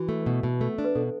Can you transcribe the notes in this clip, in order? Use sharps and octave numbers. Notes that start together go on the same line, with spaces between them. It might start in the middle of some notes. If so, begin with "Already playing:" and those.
Already playing: E3 F#4
A3
B2
B2
A3
D4
B4
B2 A4